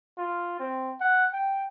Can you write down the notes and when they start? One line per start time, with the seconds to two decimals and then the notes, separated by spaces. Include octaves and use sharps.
0.18 F4
0.60 C4
1.01 F#5
1.33 G5